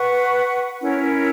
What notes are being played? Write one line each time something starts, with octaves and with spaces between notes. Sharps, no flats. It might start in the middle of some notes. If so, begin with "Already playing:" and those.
Already playing: B4 F#5 C#6
C#4 E4 A#4 C#5